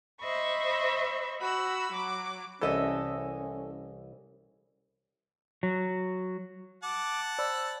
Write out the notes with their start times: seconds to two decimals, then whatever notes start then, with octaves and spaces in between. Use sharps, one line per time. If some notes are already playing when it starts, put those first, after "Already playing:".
0.21 C5 D#5 E5 B5 C#6
1.41 F#4 B5 E6
1.93 F#3 D6
2.61 C2 E3 C#4 A4 D#5 E5
5.63 F#3
6.83 F#5 A5 D6
7.38 C5 D5 B5 E6